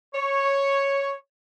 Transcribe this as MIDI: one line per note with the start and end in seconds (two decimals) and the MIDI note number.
0.14 1.14 73